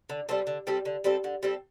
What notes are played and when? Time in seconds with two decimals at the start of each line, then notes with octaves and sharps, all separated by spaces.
0.09 D3
0.29 G3 C4 A4
0.47 D3
0.67 G3 C4 A4
0.85 D3
1.04 G3 C4 A4
1.24 D3
1.43 G3 C4 A4